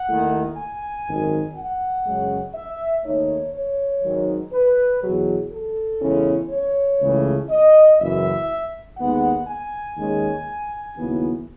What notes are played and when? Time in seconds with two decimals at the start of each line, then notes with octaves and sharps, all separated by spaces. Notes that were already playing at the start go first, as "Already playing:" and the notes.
Already playing: F#5
0.08 D#2 D#3 A3 E4
0.57 G#5
1.06 G#1 F#2 D#3
1.56 F#5
2.06 F#2 C#3 G#3 C#4
2.55 E5
3.05 D#2 D#3 A3 D#4 C#5
3.54 C#5
4.03 G#1 G#2 D#3 F#3
4.53 B4
5.02 E2 B2 F#3 G#4
5.51 A4
6.01 E2 C#3 G#3 C#4 E4
6.50 C#5
7.00 C#2 C#3 E3 A3
7.50 D#5
7.98 F#1 F#2 E3 E5
8.97 D#2 D#3 G#3 B3 F#5
9.47 G#5
9.96 D#2 D#3 G#3 C#4
10.96 D#2 C#3 F#3 B3 E4